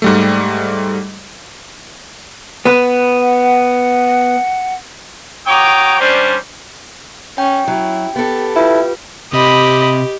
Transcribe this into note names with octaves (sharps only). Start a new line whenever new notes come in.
G#2 G3 A3
B3 B4
F#5
F#4 C#5 G5 A#5 D6 D#6
G3 C#4 D4 C5
C#4 G5
F#3 E4
B3 G4 A4
E4 F4 B4
C3 G4 D#5 B5